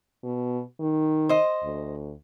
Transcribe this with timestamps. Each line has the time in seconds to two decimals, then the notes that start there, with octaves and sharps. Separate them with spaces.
0.24 B2
0.80 D#3
1.29 C5 D#5
1.65 D2